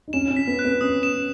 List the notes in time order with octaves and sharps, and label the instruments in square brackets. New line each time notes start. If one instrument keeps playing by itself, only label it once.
[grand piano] D#4
[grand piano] C#4 [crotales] E7
[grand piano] C#4
[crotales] B6
[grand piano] B3
[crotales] F#6
[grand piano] B3
[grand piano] C#4 [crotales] D#6
[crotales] E7